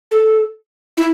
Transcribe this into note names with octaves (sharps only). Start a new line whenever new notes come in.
A4
E4